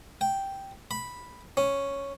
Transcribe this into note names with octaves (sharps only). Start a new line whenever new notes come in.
G5
B5
C#4